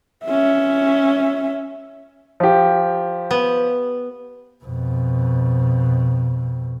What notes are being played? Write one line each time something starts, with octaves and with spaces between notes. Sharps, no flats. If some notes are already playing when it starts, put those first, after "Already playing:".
C#4 E5
F3 G4
B3
F2 B2